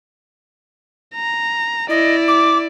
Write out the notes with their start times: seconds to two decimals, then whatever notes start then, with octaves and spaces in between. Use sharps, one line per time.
1.15 A#5
1.89 E4 D5 D#5
2.27 D6